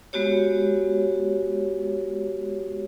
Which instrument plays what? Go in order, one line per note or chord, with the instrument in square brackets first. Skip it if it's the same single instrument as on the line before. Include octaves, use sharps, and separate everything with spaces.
[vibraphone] G#3 B3 F#4 G4 C#5